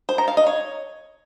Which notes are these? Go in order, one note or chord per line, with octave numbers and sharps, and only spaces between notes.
C5
A#5
F5
D#5
C#5